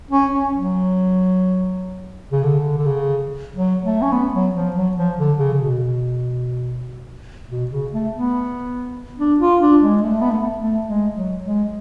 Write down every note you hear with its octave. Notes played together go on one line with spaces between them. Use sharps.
C#4
C#4
F#3
C#3
D3
D3
C#3
F#3
A3
C#4
B3
F#3
F3
F#3
F3
D3
C#3
C#3
B2
B2
C#3
A3
B3
D4
F4
D4
G#3
A3
B3
A3
A3
G#3
F#3
G#3